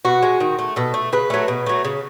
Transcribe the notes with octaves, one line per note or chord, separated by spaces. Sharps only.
B2 F#4
G#3
D#3
A3
B2 A4
A3
C#3 B4
F#3 A3
B2
F#3 A3
C#3